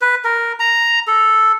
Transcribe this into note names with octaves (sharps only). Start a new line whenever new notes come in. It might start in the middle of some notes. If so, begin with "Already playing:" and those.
B4
A#4
A#5
A4